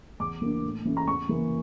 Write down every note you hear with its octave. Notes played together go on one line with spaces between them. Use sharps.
E2 D6
E3 A#3 D4
A2
E3 A3 C#4
A#5
E2 C#6
E3 A#3